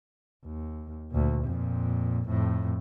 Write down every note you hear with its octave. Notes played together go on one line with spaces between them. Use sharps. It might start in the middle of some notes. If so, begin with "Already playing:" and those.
D#2
D2 A#2
F2 A#2
F2 A2